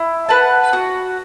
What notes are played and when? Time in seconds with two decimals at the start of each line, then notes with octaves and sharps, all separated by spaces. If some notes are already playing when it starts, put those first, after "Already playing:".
Already playing: E4
0.29 B4 F#5 A5
0.73 F#4